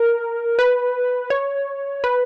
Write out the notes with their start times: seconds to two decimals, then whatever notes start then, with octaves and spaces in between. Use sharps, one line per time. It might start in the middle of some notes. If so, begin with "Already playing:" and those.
Already playing: A#4
0.59 B4
1.30 C#5
2.04 B4